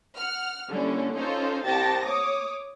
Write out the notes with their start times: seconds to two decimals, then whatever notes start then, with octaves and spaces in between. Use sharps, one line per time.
0.18 F#5 F6
0.69 D3 G3 A#3 C#4 E4
1.15 C#4 D#4 F4 A4 C5
1.65 C2 G4 A5 A6 A#6
2.04 C#5 D6 D#6